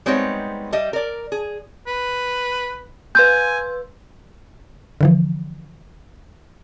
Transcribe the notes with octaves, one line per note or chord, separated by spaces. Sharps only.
G3 G#3 B3 C4 D#4 C#5
G3 G4 D#5 E5
A#4 D5
G#4
B4
B4 G#5 C6 E6 G6
D3 E3 F3